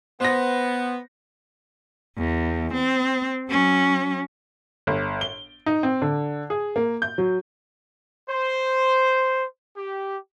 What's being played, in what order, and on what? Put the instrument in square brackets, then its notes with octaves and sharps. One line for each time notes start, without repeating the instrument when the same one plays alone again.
[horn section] B3 [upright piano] C5 A#6
[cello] E2
C4
F#3 C#4
[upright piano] G1
G7
D#4
C4
D3
G#4
A#3
G6
F#3
[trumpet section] C5
G4